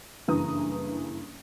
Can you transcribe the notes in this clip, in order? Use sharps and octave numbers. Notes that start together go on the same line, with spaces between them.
F#1 G2 E3 A#5 D#6